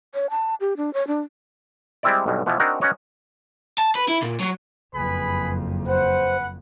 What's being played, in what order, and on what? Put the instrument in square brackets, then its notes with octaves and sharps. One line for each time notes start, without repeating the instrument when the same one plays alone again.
[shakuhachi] C#5
A5
G4
D4
C#5
D4
[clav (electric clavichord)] G3 G#3 C4 E4 D5
B1 G2 B2
B2 E3 F3 B3
C4 D4 D#4 F#4 A#4 G#5
C#4 D#4 F#4 B4 C#5 D#5
[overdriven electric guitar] A5
B4
E4
A#2
F#3
[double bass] F#1 F2 [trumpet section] G#4 B4 B5
[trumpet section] B4 F#5 [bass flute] C5